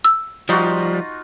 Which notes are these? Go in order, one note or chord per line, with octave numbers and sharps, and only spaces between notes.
E6
F3 G3 D#4 F4 F#4